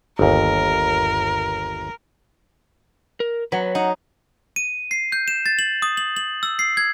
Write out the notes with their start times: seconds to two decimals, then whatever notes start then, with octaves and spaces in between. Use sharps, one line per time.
0.19 G1 D#2 A#4
3.20 A#4
3.52 F#3 B4 F#5
3.75 D#4 F#5
4.56 D#7
4.91 C7
5.12 G6
5.28 E7
5.46 A6
5.59 F#7
5.82 D#6
5.97 F#7
6.16 F#7
6.43 E6
6.59 C7
6.77 G#6